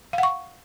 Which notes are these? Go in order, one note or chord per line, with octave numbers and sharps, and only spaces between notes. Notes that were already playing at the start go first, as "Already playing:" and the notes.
F5
F#5
C#6